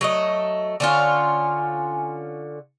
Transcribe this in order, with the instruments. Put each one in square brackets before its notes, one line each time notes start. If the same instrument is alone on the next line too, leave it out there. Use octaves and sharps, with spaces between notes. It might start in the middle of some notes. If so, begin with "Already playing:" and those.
[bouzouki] F#3 A3 D#5
[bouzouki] D3 C#4 F4 [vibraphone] G#5 C6